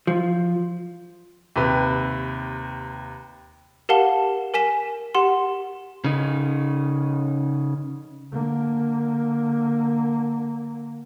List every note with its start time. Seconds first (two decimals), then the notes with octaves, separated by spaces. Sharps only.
0.07 F3
1.56 D#2 C3 B4
3.89 G4 A#4 F5 F#5 A5 G7
4.54 A#4 G#5 B6 E7
5.15 G4 F#5 C6
6.04 C#3 D#4
8.32 D3 A#3